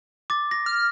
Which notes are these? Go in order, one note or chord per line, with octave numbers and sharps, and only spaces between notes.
D6 A6
A#6
F6